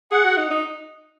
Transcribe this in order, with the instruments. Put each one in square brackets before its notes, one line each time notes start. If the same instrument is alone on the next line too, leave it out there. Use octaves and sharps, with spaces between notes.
[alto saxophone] G#4 [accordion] F#5
[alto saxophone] F#4
D#4
D#4